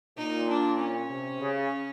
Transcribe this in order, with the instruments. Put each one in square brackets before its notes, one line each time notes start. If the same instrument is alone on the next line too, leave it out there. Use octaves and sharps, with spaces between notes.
[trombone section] A#2 [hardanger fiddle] D#4
[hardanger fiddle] D4
C#4
[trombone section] C3
C#3